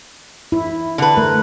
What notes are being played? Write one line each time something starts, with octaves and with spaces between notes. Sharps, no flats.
E4
D3 B4
A3 A#4